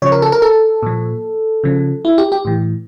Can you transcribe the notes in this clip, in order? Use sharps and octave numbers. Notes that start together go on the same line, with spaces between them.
C#3 F3 C#5
A#4
A4
A#4
A4
A#2 F3
C#3 F3
E4
G4
G4
A2 E3